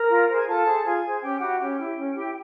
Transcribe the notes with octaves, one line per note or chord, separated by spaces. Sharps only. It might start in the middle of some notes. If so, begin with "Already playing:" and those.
Already playing: A#4 A#5
F4
G#4 C5
G#5
F4 A4 A5
G#4 C5
F4 G#4 G#5
G#4 C5
C#4 G4 G5
E4 F#4 G4 F#5
C#4 G4 G5
E4 G4
C#4
E4 G4